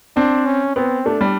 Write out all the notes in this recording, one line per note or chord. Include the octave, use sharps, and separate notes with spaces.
C4 D4
C#4
B3 C4
A3 D4
G3